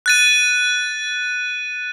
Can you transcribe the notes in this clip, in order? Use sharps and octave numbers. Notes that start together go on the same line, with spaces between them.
F#6 A6 D#7